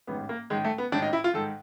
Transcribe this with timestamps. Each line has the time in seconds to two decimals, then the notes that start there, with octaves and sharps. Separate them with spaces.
0.07 A1 G#2 D#3 B3
0.29 A#3
0.50 A1 G#2 D#3 G#3
0.64 A3
0.78 B3
0.92 A1 G#2 D#3 D4
1.02 D#4
1.13 E4
1.24 F4
1.34 G#2 D#3 A4